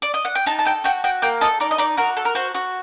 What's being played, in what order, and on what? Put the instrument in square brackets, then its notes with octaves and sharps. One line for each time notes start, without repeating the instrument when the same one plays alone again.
[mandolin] D5
D#5
F#5
G5
D#4 A5
A5
A4 G5
F#4 G5
F#4 G5
A#3 G5
A4 D#5
D#4 D5
D#5
D#4 D5
F#4 A#4
A4
A#4
F#4 C5
F#4